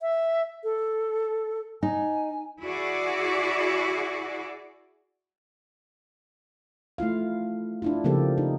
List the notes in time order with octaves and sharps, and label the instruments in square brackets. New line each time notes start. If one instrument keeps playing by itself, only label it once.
[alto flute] E5
A4
[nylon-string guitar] D#4 [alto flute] G#5
[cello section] E4 F#4 G#4 D5
[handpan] A3 E4 F4 F5
D4 E4 F4
C#3 F3 A#3 C4 G4 A4
D#4